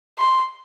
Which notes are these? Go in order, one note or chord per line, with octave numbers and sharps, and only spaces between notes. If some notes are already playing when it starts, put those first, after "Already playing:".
C6